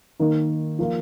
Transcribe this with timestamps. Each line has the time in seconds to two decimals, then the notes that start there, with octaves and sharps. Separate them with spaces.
0.19 D#3 A#3 D#4
0.79 F3 A#3 F4